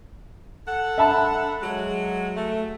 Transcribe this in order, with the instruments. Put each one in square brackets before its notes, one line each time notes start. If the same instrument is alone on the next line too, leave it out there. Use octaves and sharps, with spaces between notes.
[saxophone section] A4 F#5
[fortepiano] E5 A5 B5
[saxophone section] F#3 G#3
A3